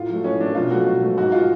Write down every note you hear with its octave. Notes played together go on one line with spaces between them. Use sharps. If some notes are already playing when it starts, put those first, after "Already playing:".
Already playing: A2 F4
F#3 A3
A2 C#4
F#3 A3 D4
B2 F4
F#3 A3 F#4
B2
F#3 A3
G#2 F#4
G#3 F4